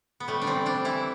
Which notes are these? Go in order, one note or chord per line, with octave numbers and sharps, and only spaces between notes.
B3
G3 A3
D4
E3 C4
G3 D4
E3 E4